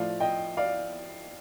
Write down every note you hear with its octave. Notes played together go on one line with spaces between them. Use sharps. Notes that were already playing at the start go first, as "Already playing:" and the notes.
Already playing: A2 F3 D5 F5
D#5 G5
D5 F5